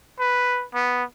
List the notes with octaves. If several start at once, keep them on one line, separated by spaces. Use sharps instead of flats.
B4
B3